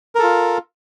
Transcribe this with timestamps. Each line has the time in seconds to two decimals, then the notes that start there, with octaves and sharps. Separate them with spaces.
0.15 A#4
0.19 A4
0.23 F4